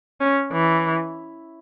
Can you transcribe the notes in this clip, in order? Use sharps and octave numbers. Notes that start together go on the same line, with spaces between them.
C#4
E3